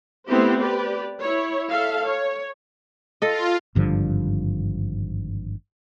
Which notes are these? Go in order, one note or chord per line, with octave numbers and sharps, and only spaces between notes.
A3 B3 C4 E4 G4 C5
G4 B4 D5
E4 C#5
A4 E5 F5
C#5
F4 A4 D#5
G#1 G2 D3 F3